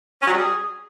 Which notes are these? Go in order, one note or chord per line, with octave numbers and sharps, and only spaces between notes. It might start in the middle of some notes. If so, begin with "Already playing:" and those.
C#4
F#3
G3
G#4